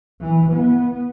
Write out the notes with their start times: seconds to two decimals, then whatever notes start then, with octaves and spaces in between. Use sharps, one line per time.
0.21 E3
0.53 B3